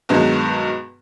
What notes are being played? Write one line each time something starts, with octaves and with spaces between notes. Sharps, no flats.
G2 B2 D#3 F#3 G#3